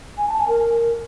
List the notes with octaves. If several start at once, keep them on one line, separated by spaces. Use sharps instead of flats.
G#5
A5
G#5
A#4